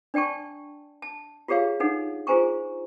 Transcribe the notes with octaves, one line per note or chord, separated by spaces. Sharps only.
D4 D5 G5 A5 C#6
A5
F4 G4 G#4 C#5 F5
D4 D#4 A4 F#5
F4 G#4 C5 G#5 A#5 C#6